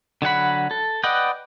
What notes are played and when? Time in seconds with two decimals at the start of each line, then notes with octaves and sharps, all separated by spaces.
0.22 D3 F#3 F#5 B5
0.71 A4
1.03 B4 D5 D#5 F#5 G5